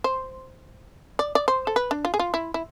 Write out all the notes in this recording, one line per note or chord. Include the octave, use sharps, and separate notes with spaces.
C5
D5
D5
C5
A4
B4
D4
F4
G#4
F4
E4
E4